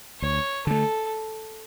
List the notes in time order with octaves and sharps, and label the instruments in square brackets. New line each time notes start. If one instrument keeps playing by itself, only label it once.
[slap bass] D2 [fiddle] C#5
[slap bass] D3 A3 [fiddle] A4